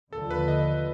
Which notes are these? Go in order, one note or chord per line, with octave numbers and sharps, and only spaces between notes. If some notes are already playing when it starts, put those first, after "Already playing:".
D#2 D3 F3 A4
B4
D#5